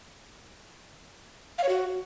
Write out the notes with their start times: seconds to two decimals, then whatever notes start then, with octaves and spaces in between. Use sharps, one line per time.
1.58 F5
1.64 C#5
1.69 F#4